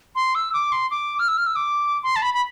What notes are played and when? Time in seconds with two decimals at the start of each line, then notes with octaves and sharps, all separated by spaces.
0.15 C6
0.35 E6
0.54 D6
0.72 C6
0.91 D6
1.19 F6
1.28 E6
1.37 F6
1.46 E6
1.56 D6
2.03 C6
2.16 A5
2.22 B5
2.34 B5